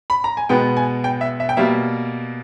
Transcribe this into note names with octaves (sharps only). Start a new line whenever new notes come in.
B5
A#5
G#5
B2 G#3 B3 G5
G#5
G5
E5
E5
G5
B2 G3 A#3 E5